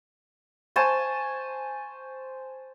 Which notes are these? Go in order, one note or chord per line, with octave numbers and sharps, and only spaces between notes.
C5 G#5 A5 C#6